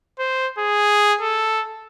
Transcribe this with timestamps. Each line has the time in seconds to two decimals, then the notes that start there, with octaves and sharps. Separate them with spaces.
0.19 C5
0.58 G#4
1.22 A4